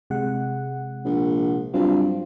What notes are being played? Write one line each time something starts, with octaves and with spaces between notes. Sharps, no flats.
C3 G#3 F#5
A#1
G2 F#3 C4 F4